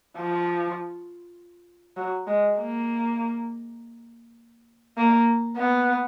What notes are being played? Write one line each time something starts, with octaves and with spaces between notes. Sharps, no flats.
F3
F#3
G#3
A#3
A#3
B3